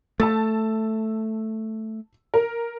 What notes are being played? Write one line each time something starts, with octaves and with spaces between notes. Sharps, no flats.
A3 A5 E6 A6
A#4